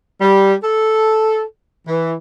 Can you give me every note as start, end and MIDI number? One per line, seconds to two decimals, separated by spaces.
0.21 0.54 55
0.63 1.42 69
1.88 2.14 52